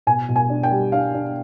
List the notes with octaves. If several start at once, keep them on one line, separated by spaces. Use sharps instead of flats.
B2 G#5
B2
G#5
D4
G5
G3
D4 F5
D4